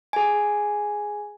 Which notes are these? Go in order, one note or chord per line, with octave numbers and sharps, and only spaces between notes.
G#4 G#5